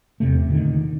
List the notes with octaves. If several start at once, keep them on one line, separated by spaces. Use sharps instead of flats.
E2 C3 A3
A#2 D3 D#3